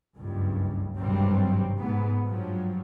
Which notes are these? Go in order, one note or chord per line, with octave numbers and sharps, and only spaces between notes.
F#1 C#2 G2
G#1 G2 C3 F#3 G3 C4
G#2 B3
G2 F3 F#3